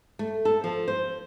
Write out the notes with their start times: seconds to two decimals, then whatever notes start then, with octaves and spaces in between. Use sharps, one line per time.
0.19 A3
0.45 A4
0.64 F3
0.88 C5